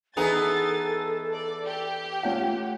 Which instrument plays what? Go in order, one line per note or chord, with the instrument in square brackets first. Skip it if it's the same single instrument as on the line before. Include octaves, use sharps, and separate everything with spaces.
[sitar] E3 B3 G#4 [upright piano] D#4 A#5 F7 [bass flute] A4 [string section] A6
[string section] D5
G4
[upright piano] A3 C#4 F#5 [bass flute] F4